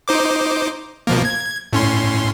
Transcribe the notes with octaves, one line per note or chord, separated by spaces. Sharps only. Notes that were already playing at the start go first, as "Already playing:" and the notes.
D#4 C5 D6
B2 F3 A#3
G#6
A2 C#4 C6